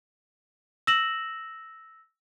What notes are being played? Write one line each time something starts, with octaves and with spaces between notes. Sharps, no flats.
E6 A#6 E7 F#7